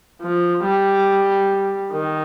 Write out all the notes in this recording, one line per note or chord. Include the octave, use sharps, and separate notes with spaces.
F3
G3
D#3